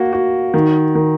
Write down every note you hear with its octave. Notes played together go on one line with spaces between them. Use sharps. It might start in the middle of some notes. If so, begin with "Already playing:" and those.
Already playing: A#3 F#4
F#4
D#3
D#3